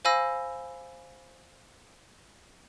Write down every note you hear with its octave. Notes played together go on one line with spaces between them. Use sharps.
C5 F5 G#5 B5 E6 A#6